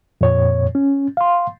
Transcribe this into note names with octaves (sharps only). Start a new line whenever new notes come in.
F2 A#2 C#5
C#4
F5 C6